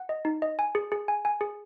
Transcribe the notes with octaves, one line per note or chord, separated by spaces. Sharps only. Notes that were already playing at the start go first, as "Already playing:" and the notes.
Already playing: F#5
D#5
D#4
D#5
G#5
G#4
G#4
G#5
G#5
G#4